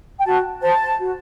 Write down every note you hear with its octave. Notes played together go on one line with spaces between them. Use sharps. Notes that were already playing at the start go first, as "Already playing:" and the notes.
G5
F#4 A5
C5 A5
F#4